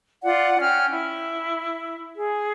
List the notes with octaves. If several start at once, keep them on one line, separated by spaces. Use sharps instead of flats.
F4 D5 F#5
C#4 G5 F6
E4
G#4